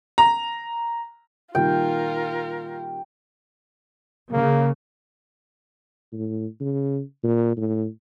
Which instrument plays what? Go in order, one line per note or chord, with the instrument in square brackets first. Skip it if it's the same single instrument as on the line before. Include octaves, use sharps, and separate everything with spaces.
[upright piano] A#5
[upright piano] A#2 D#3 G3 [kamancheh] F4 A#4 [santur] G5
[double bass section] C#3 [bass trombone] A#3
[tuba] A2
C#3
A#2
A2